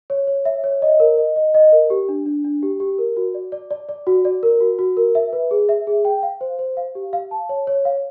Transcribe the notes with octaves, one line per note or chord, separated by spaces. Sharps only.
C#5
C#5
E5
C#5
D#5
A#4
D#5
D#5
D#5
A#4
G4
D4
D4
D4
G4
G4
A#4
F#4
D5
D5
D5
D5
F#4
D5
A#4
F#4
F#4
A#4
E5
B4
G#4
E5
G#4
G5
F5
C5
C5
F5
G4
F5
A5
C#5
C#5
F5